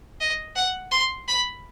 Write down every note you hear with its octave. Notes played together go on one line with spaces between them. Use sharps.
D#5
F#5
C6
B5